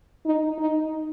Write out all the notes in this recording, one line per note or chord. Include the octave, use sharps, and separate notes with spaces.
D#4
D#4